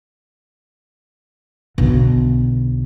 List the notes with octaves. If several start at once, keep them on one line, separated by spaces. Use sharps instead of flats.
B1 D3